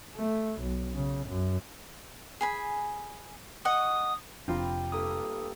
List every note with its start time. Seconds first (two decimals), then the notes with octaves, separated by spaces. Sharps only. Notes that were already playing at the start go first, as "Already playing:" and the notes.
0.15 A3
0.60 B1
0.93 C#3
1.26 F#2
2.41 G#4 G#5 B5
3.65 D#5 F#5 C#6 D#6
4.48 F1 F3 C4 D4 F4 G4 A#5 B5
4.92 G2 A#3 A4 D#6